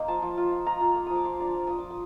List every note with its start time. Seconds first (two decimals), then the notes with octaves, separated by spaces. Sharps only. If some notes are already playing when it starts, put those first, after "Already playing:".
Already playing: A#3 D#4 C5 D#5 F5
0.08 F3 A5
0.22 F3
0.37 F4
0.51 F4
0.66 F4 A#5
0.81 F4
0.95 A#3
1.06 F3 D#6
1.16 D6
1.25 F3 C6
1.40 D4 A#5
1.55 F3
1.67 F3 D#6
1.78 D6
1.84 F3
1.90 D#6